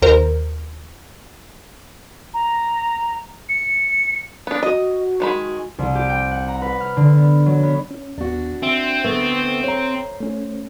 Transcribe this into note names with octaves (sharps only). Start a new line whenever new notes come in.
D#2 A#4 C5
A#5
C#7
B3 D4
F#4 D#5
D#3 G#3 B5
C2
G4
G5
F#5
A#5
B4
F6
D3
B3
F#3
B3
C#4
D#2 B3 D4 F#4
C4 E5
D2 A3 B3
C5 C#5 A#5
A3 C#4